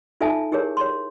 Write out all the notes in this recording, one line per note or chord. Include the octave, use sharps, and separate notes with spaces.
D#4 F4 A4 E5 G#5 A5
E4 G4 G#4 A#4 C#5
C#5 C6